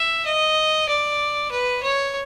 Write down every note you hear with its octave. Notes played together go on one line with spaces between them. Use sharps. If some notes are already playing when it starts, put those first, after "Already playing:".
Already playing: E5
D#5
D5
B4
C#5